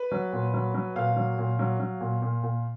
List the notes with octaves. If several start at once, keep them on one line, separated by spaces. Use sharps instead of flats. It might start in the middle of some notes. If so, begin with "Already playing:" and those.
Already playing: B4
F#3
A#2
F#3
F#3
A#2 F5
F#3
A#2
F#3
F#3
A#2
A#2
A#2